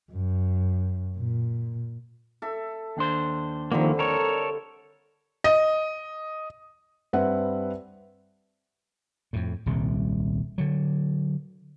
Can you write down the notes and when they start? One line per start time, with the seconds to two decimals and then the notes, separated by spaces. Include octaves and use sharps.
0.12 F#2
1.16 A#2
2.42 A4 E5
2.97 D#2 D4 C5
3.72 D3 D#3 F3 G3 A#3 C4
3.99 A4 A#4 C#5
5.44 D#5
7.13 G2 C4 B4 E5 F#5
9.33 F2 A2
9.66 D#1 C2 C3
10.58 D3 F#3